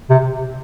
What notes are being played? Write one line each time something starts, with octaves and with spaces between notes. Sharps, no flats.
C3